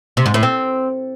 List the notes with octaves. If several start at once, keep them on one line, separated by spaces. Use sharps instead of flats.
C3
G#2
A2
C4